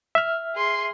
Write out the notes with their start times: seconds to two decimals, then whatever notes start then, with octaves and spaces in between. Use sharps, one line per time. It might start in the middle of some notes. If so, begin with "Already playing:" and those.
0.15 E5 F6
0.55 G#4 C6